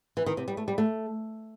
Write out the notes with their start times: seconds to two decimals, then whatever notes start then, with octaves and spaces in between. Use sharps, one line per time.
0.17 E3
0.26 D#3
0.37 C3
0.48 G3
0.57 A3
0.68 G3
0.78 A3